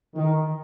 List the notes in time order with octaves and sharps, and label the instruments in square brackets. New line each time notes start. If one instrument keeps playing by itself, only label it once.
[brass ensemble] D#3